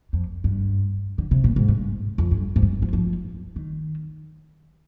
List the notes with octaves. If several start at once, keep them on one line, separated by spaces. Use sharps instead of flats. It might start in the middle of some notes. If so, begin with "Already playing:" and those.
F2
G2
D3
C3
A#2
G#2
G2
F2
G2
G#2
G2
F3
F3
D#3